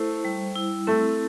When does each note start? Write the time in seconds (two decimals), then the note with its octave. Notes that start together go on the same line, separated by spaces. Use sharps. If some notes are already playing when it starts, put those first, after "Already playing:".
Already playing: A3 E4 C5
0.25 G3
0.55 E4
0.87 A3 C4